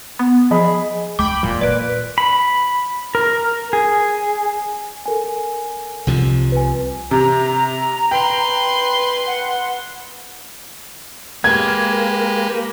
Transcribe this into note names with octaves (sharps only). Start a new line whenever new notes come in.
B3
F3 G#4 D#5 B5
D2 G5 B5 D6 G6
E1 A#2 F4
B3 B4 D5 D7
B5
A#4
G#4
A4 A#4 G#5
C2 C3 F3
B4 G#5
C3 A#5
B4 G5 C6
F#5
G#3 A#3 G4 B4 G#6